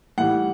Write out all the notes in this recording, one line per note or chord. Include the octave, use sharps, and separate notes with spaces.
A2 E3 G3 F#5